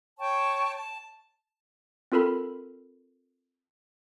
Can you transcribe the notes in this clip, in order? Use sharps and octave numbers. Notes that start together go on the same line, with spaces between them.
C#5 G5 A5 C#6
A5
C4 F4 A4 A#4 B5